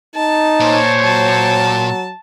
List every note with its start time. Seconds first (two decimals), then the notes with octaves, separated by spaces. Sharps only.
0.16 D#4 A5
0.60 A#2 C5 C#5
1.04 F#3 A5